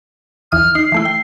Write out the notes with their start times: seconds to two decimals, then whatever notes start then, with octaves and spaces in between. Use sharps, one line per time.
0.52 E2 E3 D#6 F6
0.75 D#4 C7
0.92 E3 A3 E4
1.05 G5